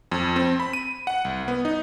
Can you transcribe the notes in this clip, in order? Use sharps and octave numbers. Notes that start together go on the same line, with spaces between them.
F2
C4
B5
D#7
F#5
C2
B3
D#4